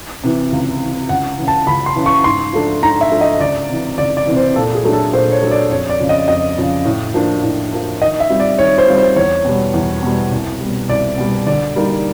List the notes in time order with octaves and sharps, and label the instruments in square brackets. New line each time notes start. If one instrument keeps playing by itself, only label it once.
[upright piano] C3 E3
C#2
C3 E3
[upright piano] C#2 [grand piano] F#5
[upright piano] C#3 E3
[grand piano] A5
[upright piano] C#2 [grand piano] B5
[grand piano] C6
[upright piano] C#3 E3
[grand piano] C#6
[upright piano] G#2 [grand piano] C6
[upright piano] F3 A3 D4
[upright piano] G#2 [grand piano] A#5
[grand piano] E5
[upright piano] F3 A3 D4
[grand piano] D#5
[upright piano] C#2 [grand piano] D5
[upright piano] C3 E3
[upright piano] C#2 [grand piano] D5
[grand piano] D5
[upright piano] C3 E3
[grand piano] C5
[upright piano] A#2 [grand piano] A4
[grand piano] G#4
[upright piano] F#3 A3 D4
[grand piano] A4
[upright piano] A#2 [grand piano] C5
[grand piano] C#5
[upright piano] F#3 A3 D4
[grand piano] D5
[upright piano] F2 [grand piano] C#5
[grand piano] D5
[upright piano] C#3 F3
[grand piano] D#5
[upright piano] F2 [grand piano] D#5
[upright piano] C#3 F3
A2
F3 A#3 D4
A2
F3 A#3 D4
[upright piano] D#3 [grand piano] D#5
[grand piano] E5
[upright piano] G3 C4 F4
[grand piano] D5
[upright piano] D#3 [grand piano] C#5
[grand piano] C5
[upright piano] G3 C4 F4
[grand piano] C5
[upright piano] E2 [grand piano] C#5
[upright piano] B2 G3
E2
B2 G3
C2
B2 G3
[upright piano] C2 [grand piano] D5
[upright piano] B2 G3
[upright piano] D3 [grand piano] D5
[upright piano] G3 A#3 D#4